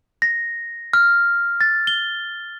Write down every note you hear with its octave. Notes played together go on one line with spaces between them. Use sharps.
A#6
F6
A6
G7